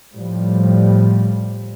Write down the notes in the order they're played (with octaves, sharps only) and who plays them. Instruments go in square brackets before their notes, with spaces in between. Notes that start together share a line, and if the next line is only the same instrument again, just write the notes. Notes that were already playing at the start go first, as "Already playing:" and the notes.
[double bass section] A2 F3 G3